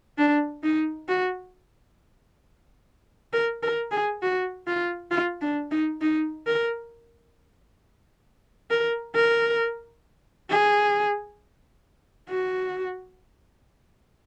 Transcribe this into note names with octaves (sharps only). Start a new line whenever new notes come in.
D4
D#4
F#4
A#4
A#4
G#4
F#4
F4
F4
D4
D#4
D#4
A#4
A#4
A#4
G#4
F#4